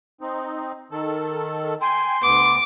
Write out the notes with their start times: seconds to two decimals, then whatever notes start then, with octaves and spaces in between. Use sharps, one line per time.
0.21 C4 D#4
0.91 D#3 A4
1.81 G5 G#5 C6
2.23 D2 B3 D6